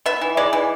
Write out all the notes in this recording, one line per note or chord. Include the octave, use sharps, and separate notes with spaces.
B3 E5
E3
G#3 D5
E3